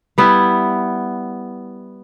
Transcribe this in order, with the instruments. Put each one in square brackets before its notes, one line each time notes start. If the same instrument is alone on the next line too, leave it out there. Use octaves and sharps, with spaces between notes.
[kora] G3 B3 E4